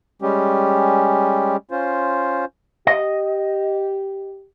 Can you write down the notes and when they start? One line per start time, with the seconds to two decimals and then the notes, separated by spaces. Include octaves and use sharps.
0.22 G3 G#3 C#4 G4
1.71 C#4 F4 C5
2.87 G4 D#5